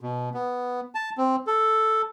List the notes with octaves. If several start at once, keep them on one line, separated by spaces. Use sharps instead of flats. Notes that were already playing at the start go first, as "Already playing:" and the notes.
B2
B3
A5
C4
A4